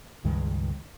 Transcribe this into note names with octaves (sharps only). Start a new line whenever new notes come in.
C#2 G2 D#3 G#3